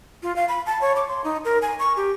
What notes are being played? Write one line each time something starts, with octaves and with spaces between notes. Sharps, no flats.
F4
F5
B5
A5
C#5
D6
C6
D#4
A#4
G#5
C#6
G4